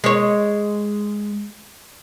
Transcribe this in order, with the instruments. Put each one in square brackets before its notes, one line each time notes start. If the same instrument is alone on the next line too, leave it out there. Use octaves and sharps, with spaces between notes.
[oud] G#3 C#5